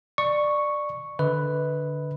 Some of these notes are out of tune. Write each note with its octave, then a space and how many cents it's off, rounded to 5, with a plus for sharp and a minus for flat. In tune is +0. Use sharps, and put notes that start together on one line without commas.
D5 +15 C#6 +0
D3 +0 B4 +0 D#5 +40